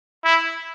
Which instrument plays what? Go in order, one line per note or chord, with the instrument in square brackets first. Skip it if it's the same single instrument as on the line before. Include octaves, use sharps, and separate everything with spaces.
[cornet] E4